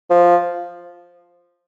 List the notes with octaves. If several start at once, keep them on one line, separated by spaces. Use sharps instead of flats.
F3